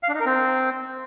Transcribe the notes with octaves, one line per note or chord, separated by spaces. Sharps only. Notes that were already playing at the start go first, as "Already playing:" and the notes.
F5
D4
D#4
A#4
C4